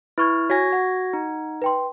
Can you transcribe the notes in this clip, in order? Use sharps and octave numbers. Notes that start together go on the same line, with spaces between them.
E4 B4 C#6 F6 G#6
F#4 C#5 G#5 G#6 A#6
F#5
D#4
B4 G5 C6